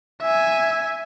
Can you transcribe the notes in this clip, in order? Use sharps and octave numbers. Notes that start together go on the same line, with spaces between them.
E5 G#5